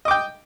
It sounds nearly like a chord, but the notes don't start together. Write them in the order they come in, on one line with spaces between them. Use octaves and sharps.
D#5 D6 G5